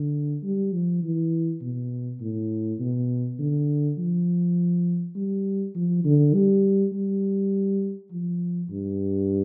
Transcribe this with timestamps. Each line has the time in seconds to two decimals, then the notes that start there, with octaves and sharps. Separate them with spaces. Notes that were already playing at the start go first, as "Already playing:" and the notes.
Already playing: D3
0.43 G3
0.73 F3
1.03 E3
1.61 B2
2.20 A2
2.79 B2
3.39 D3
3.98 F3
5.16 G3
5.75 F3
6.04 D3
6.34 G3
6.93 G3
8.11 F3
8.70 G2